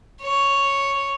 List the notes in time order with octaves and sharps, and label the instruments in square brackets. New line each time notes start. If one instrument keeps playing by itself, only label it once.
[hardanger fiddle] C#5